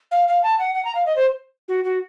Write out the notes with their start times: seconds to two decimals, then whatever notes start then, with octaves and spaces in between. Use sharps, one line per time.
0.11 F5
0.28 F5
0.43 A5
0.59 F#5
0.74 F#5
0.85 A#5
0.95 F5
1.06 D#5
1.16 C5
1.68 F#4
1.84 F#4